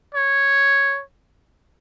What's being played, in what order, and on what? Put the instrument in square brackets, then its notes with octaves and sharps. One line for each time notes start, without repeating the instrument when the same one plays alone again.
[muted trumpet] C#5